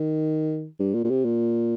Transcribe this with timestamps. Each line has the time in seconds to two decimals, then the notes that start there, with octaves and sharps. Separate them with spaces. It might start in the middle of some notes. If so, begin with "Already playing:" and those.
Already playing: D#3
0.80 G2
0.94 A#2
1.04 A#2
1.10 C3
1.24 A#2